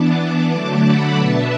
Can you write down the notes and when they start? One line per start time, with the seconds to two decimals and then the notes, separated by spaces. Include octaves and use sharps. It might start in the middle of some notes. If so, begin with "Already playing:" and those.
Already playing: E3 B3 D4 A5 D6
0.51 D3 F#3 A3 A5 D6
0.84 F#5 B5
1.17 B2 B3 D4 E5 A5